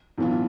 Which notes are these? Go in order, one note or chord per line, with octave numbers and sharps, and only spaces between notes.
B1 A2 E3 B3 F4